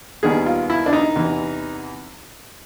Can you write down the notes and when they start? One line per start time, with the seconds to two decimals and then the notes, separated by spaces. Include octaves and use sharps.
0.23 D#2 D#3 G3 B3 G#4
0.46 F4
0.70 E4
0.86 D4
0.93 D#4
1.16 E2 C3 E3